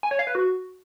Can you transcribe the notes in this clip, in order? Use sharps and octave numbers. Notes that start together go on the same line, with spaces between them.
G#5
C#5
F5
B4
F#4